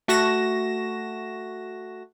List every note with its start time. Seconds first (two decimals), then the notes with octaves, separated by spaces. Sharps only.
0.08 A3 F#4 A#6 E7